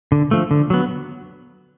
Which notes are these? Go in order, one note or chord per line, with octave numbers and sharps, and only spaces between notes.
D3
F3 A3
D3
F#3 B3